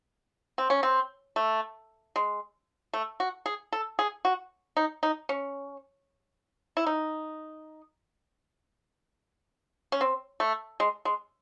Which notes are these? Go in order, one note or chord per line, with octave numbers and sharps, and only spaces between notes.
C4
C#4
C4
A3
G#3
A3
F#4
G#4
A4
G#4
F#4
D#4
D#4
C#4
E4
D#4
C#4
C4
A3
G#3
G#3